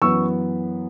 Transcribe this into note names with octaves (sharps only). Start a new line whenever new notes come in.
F#2 E3 B3 C#6 E6